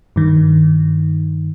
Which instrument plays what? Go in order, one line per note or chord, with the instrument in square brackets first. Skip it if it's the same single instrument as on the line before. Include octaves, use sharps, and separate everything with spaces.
[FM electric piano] G2 D#3